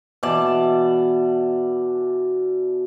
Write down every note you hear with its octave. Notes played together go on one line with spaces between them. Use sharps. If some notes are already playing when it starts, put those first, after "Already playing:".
B2 E3 D5 A5